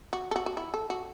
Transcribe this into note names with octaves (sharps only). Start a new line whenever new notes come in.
F#4
A4
F#4
F#4
E4
A4
F#4